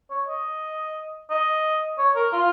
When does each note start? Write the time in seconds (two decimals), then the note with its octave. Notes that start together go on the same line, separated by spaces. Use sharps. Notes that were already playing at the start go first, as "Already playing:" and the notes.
0.10 C#5
0.28 D#5
1.30 D#5
1.98 C#5
2.16 A#4
2.33 F4